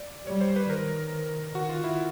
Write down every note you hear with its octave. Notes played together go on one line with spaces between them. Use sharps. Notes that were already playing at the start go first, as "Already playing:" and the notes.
Already playing: D5
G3 C#5
C5
B4
D#3 A#4
D#3 F#4
F4
E4